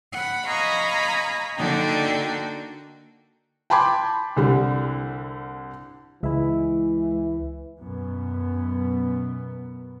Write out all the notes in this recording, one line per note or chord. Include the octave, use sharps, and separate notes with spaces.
F#5 B5
D#5 F5 G#5 A#5 B5 C#6
D3 A#3 D4 D#4 F#4 G5
G5 A5 B5 C6 D6 G#6
C2 D3 G3
C#2 E3 G#3 E4 E5
F#2 B2 B3